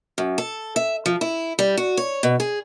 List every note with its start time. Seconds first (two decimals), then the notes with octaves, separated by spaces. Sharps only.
0.18 F#2
0.38 A4
0.76 E5
1.06 F3
1.21 E4
1.59 G3
1.77 F#4
1.97 C#5
2.23 B2
2.40 G#4